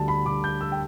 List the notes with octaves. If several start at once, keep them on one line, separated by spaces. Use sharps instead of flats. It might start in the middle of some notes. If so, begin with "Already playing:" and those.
Already playing: D2 D3 G3 A5
B5
D2 D3 G3 D6
G6
E6
G5